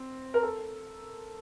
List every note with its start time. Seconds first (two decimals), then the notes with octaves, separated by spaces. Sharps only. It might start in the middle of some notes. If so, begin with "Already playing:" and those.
Already playing: C4
0.34 A#4
0.43 A4